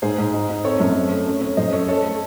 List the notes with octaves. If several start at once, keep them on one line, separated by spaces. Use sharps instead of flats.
G#2 G#4 C5
G#2
D#4
D#4
C4 A4 C#5
F#2
A3
A3
C#4
C#4
F#2 C5 D#5
C#4 A4 C#5
A3 A4 C#5
A3